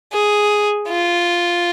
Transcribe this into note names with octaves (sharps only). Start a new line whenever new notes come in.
G#4
F4